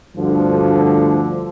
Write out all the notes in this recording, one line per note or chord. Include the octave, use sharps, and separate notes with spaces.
D2 G2 D3 F3